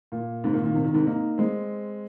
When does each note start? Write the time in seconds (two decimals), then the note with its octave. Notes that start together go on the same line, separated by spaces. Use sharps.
0.12 A#2
0.44 G#2 C3
0.53 A#2 D#3
0.64 A#2 D#3
0.75 C3
0.84 D#3
0.94 G#2 C3
1.06 A#3 D#4
1.38 G#3 C4